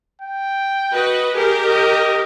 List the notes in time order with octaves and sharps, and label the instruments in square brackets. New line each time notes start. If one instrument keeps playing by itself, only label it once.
[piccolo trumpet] G5
[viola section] F#4 B4 D#5
[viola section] G4 A#4 [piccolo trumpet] G#4
[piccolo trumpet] D#5